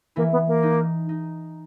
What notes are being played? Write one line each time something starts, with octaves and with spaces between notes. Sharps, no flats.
E3 A#3 E4
B3
A#3
D#4
D#4